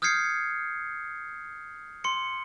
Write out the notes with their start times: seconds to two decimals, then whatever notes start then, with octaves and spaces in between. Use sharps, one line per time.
0.02 D#6 F6 G6 G#6 C7 C#7
2.04 C6 C#7